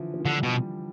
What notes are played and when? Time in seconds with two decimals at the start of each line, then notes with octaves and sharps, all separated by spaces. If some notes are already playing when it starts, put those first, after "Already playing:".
Already playing: D3 E3 F3
0.14 F3
0.20 E3
0.26 D3 F3
0.37 G3
0.43 B2